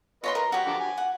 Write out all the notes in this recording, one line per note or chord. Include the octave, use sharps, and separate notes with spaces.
F4 B4 C#5 D#5 A#5 C6
A#4
F#3 F#4 G4
D3 F3 D6
G#5
F#5